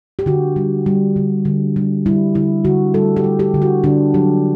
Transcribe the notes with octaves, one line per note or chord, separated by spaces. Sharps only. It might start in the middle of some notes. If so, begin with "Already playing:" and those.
G4
D3 F#4
G3
G3
D3
D3
G3
G3 E4
D3 E4
D3 F#4
G3 A4
G4
G3
G4
D3
F#4
D3 D4
F#3 G4